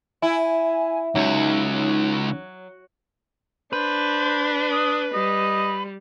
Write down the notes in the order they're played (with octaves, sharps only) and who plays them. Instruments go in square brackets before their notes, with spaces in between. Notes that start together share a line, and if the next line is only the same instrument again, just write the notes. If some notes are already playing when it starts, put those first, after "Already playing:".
[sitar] E4 [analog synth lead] G#5
[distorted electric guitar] C#2 [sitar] F#3 [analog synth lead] D#4
[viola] D4 [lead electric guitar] B4 [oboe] C5
[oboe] D#6
[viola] G3 [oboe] D#5